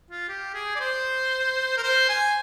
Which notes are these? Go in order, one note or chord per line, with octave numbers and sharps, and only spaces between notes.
F4
G4
G#4
D5
C5
A#4
C5
G#5